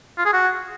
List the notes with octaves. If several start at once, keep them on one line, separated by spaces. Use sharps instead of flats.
F4
G#4
F#4